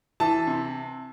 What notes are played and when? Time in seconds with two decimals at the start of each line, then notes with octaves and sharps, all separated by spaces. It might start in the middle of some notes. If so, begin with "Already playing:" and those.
0.20 E3 A5
0.47 C3